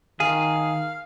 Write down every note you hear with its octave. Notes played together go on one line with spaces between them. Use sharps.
D#3 G#4 F5